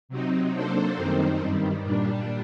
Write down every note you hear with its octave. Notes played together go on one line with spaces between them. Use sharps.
C3 F#3 C4 D#4
F#3 A#3 D4 A4 C5
F#2 D#3 G3 C4 D#4
G2 D#3 G3
A#2 G3 D4